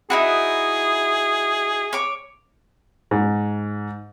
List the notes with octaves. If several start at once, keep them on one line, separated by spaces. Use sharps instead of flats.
D#4 E4 F#4 G#4
C#5 D6
G#2